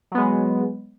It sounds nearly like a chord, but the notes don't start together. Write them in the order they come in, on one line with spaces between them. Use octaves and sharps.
F#3 B3 G#3